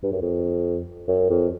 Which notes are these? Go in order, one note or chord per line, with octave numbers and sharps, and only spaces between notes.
G2
F#2
F2
F#2
F2